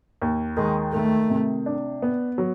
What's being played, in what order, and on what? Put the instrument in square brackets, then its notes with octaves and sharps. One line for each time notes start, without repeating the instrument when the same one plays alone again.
[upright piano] D#2
[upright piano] D#3 [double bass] G#3
[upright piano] D#3 [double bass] A3
[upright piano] C3
D4
B3
F#3